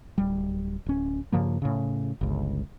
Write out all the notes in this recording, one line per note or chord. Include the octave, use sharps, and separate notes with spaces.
D1 G3
D1 C#4
G2 C#3 F3 A#3
A2 C#3
G1 C#2